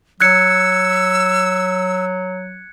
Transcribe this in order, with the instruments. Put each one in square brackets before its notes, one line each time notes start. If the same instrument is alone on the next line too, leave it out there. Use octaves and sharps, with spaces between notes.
[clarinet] F#3 [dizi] E6 [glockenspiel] F#6 G#6 C#7